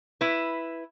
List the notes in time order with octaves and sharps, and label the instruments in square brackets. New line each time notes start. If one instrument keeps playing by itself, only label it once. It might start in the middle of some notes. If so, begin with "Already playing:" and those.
[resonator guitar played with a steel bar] E4 B4